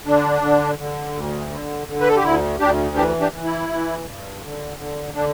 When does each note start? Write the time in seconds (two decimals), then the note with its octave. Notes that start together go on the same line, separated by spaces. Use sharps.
0.06 D3 D4
0.42 D3
0.78 D3
1.15 D2
1.51 D3
1.87 D3
2.01 B4
2.08 A4
2.16 G4
2.24 D2 E4
2.59 D2 D4 G4
2.96 E3 D4 G4
3.21 D4 G4
3.32 E3
3.44 E4
3.69 E3
4.05 G2
4.42 D3
4.78 D3
5.14 D3 D4